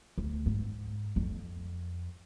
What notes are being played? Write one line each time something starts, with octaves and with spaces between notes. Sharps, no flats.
D2
G#2
F2